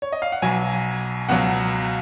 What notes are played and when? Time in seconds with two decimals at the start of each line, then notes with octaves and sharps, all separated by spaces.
0.02 C#5
0.12 D#5
0.22 F5
0.32 F#5
0.42 B1 B2 F#3 G#5
1.29 C#2 B2 F#3 F#5